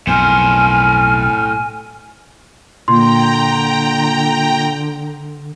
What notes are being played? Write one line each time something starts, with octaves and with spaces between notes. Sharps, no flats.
B1 F2 A2 C5 G#5 F6
A#2 D3 G5 A#5 C6